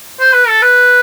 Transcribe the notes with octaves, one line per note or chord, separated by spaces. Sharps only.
C5
B4
A4
B4